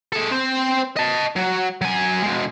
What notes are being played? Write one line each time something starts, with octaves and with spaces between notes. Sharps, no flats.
G#3 A4
C4 C5
D#5 A5
F#3 F#4
F#3 G#5
B2 G#3